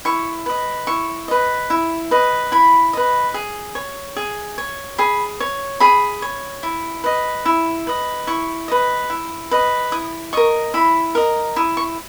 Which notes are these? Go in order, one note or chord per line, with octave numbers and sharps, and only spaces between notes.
E4 C#6
B4 D#5
E4 C#6
B4 D#5
E4
B4 D#5
E4 B5
B4 D#5
G#4
C#5
G#4
C#5
G#4 B5
C#5
G#4 B5
C#5
E4
B4 D#5
E4
B4 D#5
E4 C#6
B4 D#5
E4
B4 D#5
E4 D#6
A#4 D#5 C#6
E4 B5
A#4 D#5
E4 D#6
C#6